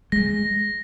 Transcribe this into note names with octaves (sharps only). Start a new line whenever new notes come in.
G#3 A#6